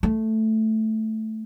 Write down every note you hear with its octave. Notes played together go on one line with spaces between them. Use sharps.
A3